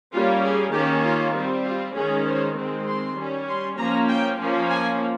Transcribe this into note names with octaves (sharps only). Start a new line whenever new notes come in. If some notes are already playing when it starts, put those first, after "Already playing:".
G3 A#3 C#4 F4
G#4
D#3 A#3 C#4 G4
F4
G3 C4
F4
D#3 G#3 C#4 G#4
C5
D#3 G#3 C4
C6
G3 C#4
C6
F3 A#3 C#4 A#5
G5
F3 A#3 C#4
G#5